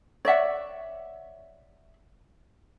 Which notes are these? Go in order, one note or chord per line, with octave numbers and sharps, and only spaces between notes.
C#5 D5 E5 F#5